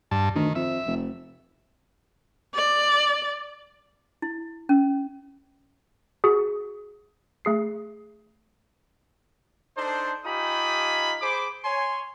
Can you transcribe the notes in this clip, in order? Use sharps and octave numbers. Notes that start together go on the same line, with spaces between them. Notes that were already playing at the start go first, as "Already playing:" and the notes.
G2 A5
D2 D#3
F2 E5
F1
D5
E4
C#4
F#4 G#4
A3 G#4 C7
D4 D#4 A4 C5
D#4 F4 G4 G#5 B5 D#6
G#4 C5 B5 D6
C#5 G#5 C6